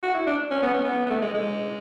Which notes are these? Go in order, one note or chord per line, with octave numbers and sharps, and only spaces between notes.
F#4
E4
D4
C#4
B3
C#4
B3
B3
A3
G#3
G#3